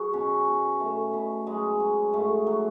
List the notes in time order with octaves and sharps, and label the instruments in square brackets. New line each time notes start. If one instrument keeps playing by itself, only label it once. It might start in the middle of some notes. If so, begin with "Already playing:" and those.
Already playing: [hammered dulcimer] F#3 F#4 G#4
B2 C#4
B2
B2 A3
B2
F#3 G#3
F#3
G#2 A3
F#3